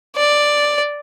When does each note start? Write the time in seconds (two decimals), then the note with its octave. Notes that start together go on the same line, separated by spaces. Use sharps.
0.16 D5